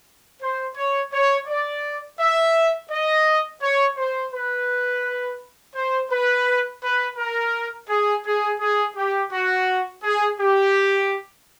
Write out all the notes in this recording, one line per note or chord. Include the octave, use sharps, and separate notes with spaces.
C5
C#5
C#5
D5
E5
D#5
C#5
C5
B4
C5
B4
B4
A#4
G#4
G#4
G#4
G4
F#4
G#4
G4